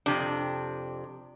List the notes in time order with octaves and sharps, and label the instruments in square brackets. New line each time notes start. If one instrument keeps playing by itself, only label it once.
[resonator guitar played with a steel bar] F2 C3 D4